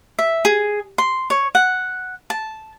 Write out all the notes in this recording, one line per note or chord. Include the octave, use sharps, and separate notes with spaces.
E5
G#4
C6
C#5
F#5
A5